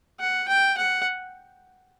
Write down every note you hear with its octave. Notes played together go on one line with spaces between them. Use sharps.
F#5
G5
F#5